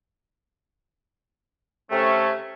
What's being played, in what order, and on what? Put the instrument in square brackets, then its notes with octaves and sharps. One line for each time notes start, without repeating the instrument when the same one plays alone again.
[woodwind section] C3 A3 C#4